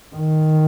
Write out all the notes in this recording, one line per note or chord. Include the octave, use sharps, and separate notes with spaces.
D#3